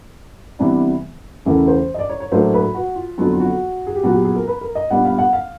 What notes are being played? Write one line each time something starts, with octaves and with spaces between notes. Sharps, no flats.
C3 E3 G3 B3 D4
E2 C#3 E3 A3 C#4 A#4
C5
D#5
D5
C#5
C#5
A2 F#3 A#3 D4 C5
B4
F#4
F4
F2 D3 F#3 B3 F4
F4
F#4
G#4
G4
A#2 F#3 B3 F#4
G4
G#4
A#4
B4
A#4
D#5
A#2 G3 B3 D4 F#5
F5
F#5
F5